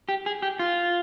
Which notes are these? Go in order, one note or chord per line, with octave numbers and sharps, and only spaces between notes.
G4
G#4
G4
F4